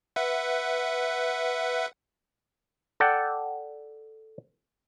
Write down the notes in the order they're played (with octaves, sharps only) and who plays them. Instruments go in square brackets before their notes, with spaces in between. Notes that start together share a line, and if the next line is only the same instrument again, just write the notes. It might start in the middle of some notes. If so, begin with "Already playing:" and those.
[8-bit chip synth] B4 E5 F#5
[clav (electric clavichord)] A4 D5 F#5 G5